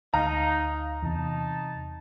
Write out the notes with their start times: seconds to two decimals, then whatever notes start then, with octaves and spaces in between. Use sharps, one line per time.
0.14 D2 D#4 F5 A#5
1.03 E2 C3 D#4 A5